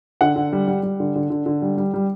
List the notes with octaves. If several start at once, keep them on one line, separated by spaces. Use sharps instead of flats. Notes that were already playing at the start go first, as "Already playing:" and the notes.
D3 F#5
D3
G3
G3
G3
D3
D3
D3
D3
G3
G3
G3